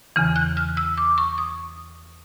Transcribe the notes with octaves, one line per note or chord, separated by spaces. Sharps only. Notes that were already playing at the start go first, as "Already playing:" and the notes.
E2 C#3 E3
F#6
F6
E6
D6
C#6
D#6